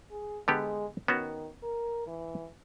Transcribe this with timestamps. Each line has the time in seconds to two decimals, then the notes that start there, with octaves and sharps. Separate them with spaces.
0.11 G#4
0.48 D3 G#3 B3 G4
1.08 D#3 B3 C#4 F#4
1.63 A#4
2.07 E3